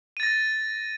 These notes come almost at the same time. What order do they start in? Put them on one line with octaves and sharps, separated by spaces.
D#7 A6 A#6